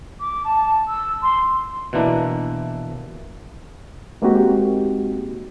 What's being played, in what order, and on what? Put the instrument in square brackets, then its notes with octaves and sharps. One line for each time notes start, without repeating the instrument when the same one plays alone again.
[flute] D6
A5
E6
C6
[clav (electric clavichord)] B2 E3 A#3 D4 E4
[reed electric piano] G#3 A#3 C4 D#4 F#4 G4